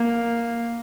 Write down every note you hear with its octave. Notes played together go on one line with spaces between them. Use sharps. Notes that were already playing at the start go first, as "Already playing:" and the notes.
Already playing: A#3